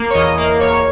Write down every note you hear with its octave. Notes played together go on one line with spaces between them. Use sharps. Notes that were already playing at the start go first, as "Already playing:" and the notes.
Already playing: A#3
C#5
E2 D#5
A#3
E2 C#5